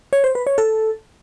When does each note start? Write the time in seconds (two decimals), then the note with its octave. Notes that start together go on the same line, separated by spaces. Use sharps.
0.13 C#5
0.24 C5
0.35 B4
0.47 C#5
0.58 A4